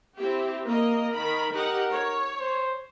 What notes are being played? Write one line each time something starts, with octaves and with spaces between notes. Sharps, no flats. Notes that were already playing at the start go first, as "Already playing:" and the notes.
C4 E4 G4
A#3 A#4 D#5
D#3 B5
D#4 G4 A#4 F#5
C#5
C5